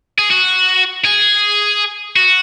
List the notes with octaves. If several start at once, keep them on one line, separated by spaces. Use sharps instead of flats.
G#4
F#4
G#4
F#4